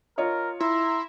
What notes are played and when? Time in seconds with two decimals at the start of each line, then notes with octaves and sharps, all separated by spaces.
0.18 F4 A#4 C#5 D#5
0.60 E4 E5 A#5 C6